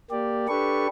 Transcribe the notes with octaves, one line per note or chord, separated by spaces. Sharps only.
A#3 G4 D5
D4 G4 A4 B4 C#6